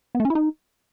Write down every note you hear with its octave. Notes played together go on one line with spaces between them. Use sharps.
B3
A3
C#4
E4
D#4